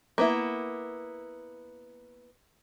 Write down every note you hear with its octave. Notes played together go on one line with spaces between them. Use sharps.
A#3 B3 E4